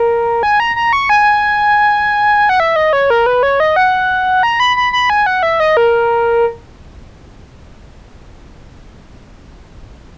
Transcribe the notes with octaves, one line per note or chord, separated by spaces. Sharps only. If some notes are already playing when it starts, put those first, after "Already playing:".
Already playing: A#4
G#5
A#5
A#5
C#6
G#5
F#5
E5
D#5
C#5
A#4
B4
C#5
D#5
F#5
A#5
B5
B5
B5
G#5
F#5
E5
D#5
A#4